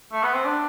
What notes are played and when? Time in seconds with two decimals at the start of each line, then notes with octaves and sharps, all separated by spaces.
0.12 A3
0.23 B3
0.34 C4
0.45 D4